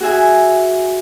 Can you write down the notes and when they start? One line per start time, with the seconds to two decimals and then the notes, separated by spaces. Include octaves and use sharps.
0.01 F#4 G#4 E5 G#5